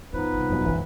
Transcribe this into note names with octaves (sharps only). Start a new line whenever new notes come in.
F#2 E3 F3 B3 D#4 B4
C3 G3
F1 F#2 B2
B1 F#2 D3 E3 G#3